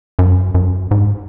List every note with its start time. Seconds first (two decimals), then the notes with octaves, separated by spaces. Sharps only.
0.19 F#2
0.55 F#2
0.91 G#2